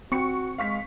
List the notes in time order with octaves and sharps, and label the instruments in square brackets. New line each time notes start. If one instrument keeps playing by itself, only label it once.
[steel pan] C4 [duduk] F#4 [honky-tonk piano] C#6 C#7
[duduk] G#3 [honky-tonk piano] F5 C#6 B6